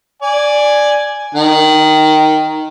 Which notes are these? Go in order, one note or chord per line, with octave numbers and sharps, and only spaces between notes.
D5 G#5
D#3